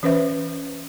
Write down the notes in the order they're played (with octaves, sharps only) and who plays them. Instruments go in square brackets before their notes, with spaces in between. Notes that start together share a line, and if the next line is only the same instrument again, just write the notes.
[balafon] E3 C#4 B4 C5 E5